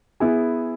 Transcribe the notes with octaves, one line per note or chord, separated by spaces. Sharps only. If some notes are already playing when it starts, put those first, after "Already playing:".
B3 E4 G#4